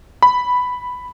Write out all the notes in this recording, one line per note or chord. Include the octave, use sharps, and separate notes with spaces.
B5